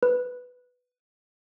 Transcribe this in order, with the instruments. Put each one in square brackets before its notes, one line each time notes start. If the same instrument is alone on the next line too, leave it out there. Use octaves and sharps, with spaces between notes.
[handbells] B4